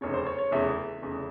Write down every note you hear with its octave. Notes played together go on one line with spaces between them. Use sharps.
F1 E2 C#3 C#5
C5
C#5
C#5
F1 E2 C#3 E5
F1 E2 C#3